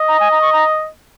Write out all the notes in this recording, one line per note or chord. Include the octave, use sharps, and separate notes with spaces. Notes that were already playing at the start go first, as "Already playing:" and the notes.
Already playing: D#5
A#5
G#5
A#5
C#6
A#5